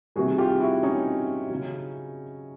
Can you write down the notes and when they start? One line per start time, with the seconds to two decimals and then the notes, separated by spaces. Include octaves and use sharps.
0.16 C3 D#3 G3 F#4 G#4
0.38 F4 G4
0.60 E4 F#4
0.83 C#4 D#4
1.50 C#3 F#3